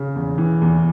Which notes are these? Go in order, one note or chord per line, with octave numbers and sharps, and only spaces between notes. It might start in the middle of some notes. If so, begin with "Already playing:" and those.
Already playing: C#3
E2
E3
E2